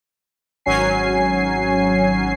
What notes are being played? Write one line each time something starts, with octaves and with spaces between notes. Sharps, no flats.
G#1 F#3 C#4 G#5 C7